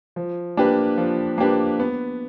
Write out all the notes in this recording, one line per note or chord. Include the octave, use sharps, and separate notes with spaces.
F3
A#3 D4 G4 B4
F3
A#3 D4 G4 B4
B3